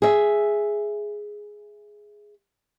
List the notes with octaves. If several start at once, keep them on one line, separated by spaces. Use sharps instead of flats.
G#4 E5